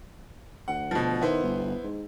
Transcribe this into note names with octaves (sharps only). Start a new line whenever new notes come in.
D2 F#5
B2 F3
D#3 B3 E4 C5
G1
G#2